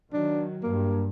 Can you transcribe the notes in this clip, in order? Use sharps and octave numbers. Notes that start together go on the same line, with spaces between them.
D#3 F#3 D4
G2 A#3